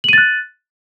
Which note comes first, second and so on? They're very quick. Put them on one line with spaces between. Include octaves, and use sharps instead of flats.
F#7 D#7 A6 F#6